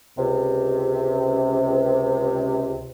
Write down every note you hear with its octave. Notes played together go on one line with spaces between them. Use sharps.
C#2 C3